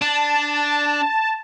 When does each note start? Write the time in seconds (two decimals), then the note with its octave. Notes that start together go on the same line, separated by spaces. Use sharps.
0.02 D4 A5